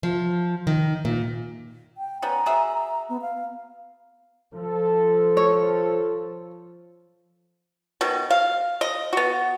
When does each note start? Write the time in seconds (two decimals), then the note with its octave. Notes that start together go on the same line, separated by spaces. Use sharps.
0.03 F3
0.67 D#3
1.05 A#2
1.97 G5
2.22 G3 B3 C#4 A#5
2.46 F#4 G#4 E5
2.72 A#5
3.09 B3
3.22 F5
4.54 F3 A4
5.37 C#5
8.01 B2 D#3
8.30 F5
8.81 D#5
9.13 B3 F#4